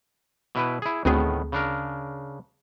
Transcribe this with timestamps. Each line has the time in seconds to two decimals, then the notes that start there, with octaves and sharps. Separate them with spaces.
0.55 B2 E4 B4
0.82 E4 G#4
1.05 D2 A2 D#3 B3 C4 G#4
1.52 C#3 D4 A#4